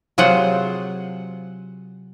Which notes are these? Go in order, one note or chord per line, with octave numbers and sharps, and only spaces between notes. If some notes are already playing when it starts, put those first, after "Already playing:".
C3 F#3 F4 G#4 C5 F#5